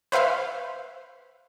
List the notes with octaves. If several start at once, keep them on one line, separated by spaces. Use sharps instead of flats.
B4 C5 E5 F5